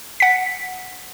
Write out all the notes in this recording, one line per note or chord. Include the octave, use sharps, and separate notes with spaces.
F#5 B6